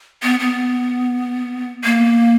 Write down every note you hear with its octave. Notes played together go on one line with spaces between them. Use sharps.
B3
B3
A#3